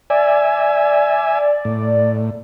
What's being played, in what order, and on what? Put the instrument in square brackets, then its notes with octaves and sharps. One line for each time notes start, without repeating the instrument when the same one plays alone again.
[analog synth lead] D5 [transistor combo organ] E5 G#5
[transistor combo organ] A2